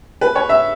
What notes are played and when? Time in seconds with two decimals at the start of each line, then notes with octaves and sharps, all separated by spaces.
0.21 B4
0.35 C#5
0.49 E5